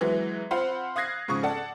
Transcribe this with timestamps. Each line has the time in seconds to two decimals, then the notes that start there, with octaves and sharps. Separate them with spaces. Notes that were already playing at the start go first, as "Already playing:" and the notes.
0.01 E3 F#3 G#3 B3
0.51 C4 F4 C5 F#5 B5 C6
0.96 F5 D#6 F#6 G#6 A#6 C7
1.28 G#2 C#3 F3 C#6 D#6
1.43 A4 D5 F#5 A5